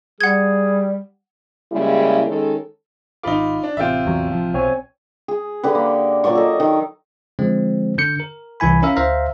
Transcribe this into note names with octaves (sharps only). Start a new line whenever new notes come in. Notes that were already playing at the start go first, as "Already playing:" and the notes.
G3 G#4 F#5 G#6
C#3 G3 G#3 A#3 E4
D#3 G#3 C#4 A4
G#1 D#4 F4 B5 D6
D4
A1 C3 F4 E5 G5
E2 F#3
F3
B1 C4 C#5 G#5
G#4
D3 G4 B4
A#3
A#2 F#3 D5 C#6
A4 D#5
D#3
D3 F3 G#3 C4
D3 G6 C#7
A#4
C2 E3 E4 G#5 B5
C#4 E4 A#4 E5 F5
D2 C5 E5 F5 A#5